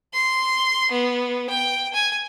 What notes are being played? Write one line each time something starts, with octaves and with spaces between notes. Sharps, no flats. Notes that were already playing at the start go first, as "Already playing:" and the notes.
C6
B3
G5
G#5